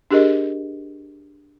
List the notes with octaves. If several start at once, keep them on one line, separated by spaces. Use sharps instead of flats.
D4 G4 G#4 A#4 D#5